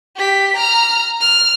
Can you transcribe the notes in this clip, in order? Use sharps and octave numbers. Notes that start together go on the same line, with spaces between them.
G4 B6
A#5 F6
F6